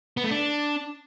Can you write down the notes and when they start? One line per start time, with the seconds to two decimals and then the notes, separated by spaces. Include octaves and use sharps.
0.17 B3
0.24 A3
0.31 D4